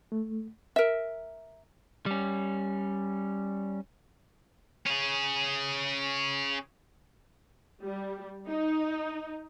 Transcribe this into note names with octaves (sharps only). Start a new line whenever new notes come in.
A3
A#4 E5
G3 C#4
C#4 G#4
G3
D#4